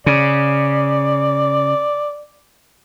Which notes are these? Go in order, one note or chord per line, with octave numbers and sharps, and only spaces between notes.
C#3 D5